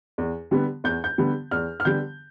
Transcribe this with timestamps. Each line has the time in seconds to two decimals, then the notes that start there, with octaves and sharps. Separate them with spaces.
0.18 E2
0.51 D3 G3 B3
0.84 E2 G6
1.04 G6
1.18 D3 G3 B3
1.51 E2 F6
1.80 F6
1.85 D3 G3 B3 G6